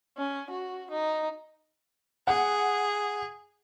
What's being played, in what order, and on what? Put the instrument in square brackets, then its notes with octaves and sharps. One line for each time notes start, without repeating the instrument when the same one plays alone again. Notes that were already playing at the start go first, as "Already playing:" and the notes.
[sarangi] C#4
F#4
D#4
[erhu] G#4 [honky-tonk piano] F#5